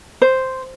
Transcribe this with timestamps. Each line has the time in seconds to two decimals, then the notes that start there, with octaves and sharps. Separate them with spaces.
0.22 C5